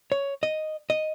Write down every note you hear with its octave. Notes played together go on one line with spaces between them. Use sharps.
C#5
D#5
D#5